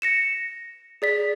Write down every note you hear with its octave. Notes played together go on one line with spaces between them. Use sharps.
A#6 C#7 E7
G#4 D5 B6